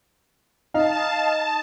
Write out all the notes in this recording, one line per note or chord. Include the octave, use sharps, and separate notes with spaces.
D#4 F5 A5